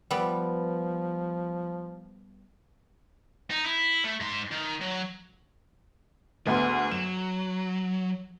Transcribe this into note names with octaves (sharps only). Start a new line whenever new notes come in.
F3 G3 B3
D#4
E4
A3
G#2 C6
D#3
F#3
D2 B3 G#4 C6
F#3 E7